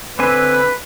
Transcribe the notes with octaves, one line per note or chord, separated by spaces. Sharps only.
D3 C4 B4 G#5